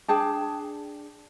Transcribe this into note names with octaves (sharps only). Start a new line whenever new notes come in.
D4 G#4 G5 A5